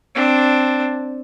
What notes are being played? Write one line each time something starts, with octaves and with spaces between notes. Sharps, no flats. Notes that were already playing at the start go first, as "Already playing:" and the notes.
C4 D4